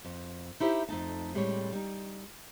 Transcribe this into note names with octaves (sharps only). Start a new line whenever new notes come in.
F2
D#4 E4 G4 C5 D#5 E5
F2 A3 D#4 A5
A2 G3 G#3 C4 C#5
G3 D#4